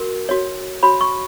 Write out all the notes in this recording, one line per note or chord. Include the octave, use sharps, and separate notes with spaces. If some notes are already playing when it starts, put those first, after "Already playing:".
Already playing: F#4 A#4
F#4 C#5
F#4 C#5 B5
C#6